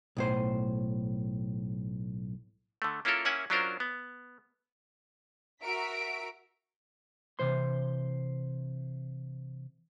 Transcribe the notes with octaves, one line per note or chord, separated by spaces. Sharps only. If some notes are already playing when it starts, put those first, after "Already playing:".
B1 A2 C5
D3 A3
A#3 C#4 E4 F4 A4 A#4
A#3 C#4 E4 F#5 G#5
F#3 C#4 D4 F4 A#4 C5
B3
F#4 A#4 E5 B6 D7
C3 E3 C5 C6